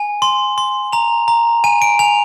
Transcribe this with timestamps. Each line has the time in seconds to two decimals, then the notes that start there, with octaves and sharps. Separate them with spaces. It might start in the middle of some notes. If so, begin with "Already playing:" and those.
Already playing: G#5
0.22 C6
0.58 C6
0.92 A#5 F7
1.28 A#5
1.64 G#5 D#7
1.82 D7
1.99 G#5 F7